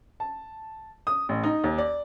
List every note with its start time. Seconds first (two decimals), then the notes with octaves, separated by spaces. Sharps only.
0.20 A5
1.07 D#6
1.29 A1
1.43 D#4
1.64 D#2
1.78 D5